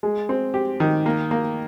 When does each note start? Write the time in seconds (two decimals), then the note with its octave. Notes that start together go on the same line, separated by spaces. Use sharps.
0.03 G#3
0.29 C4
0.54 G4
0.80 D#3
1.06 A#3
1.31 A#3